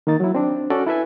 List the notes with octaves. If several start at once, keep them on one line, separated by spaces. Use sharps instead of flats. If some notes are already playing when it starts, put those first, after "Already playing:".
D#3 A#3 D#4 A6
F#3 E4
C4 D4
C#4 F#4 A4 D5
E4 A4 B4 E5 G#5